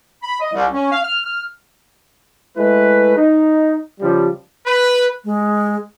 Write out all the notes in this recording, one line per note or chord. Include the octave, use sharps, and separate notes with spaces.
B5
D#5
C2
C#4
F5
F6
F6
G#3 A3 E4 B4
D#4
C#3 F3 G3
B4
G#3